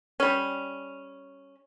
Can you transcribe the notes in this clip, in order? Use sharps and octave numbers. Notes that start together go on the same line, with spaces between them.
G3 C#4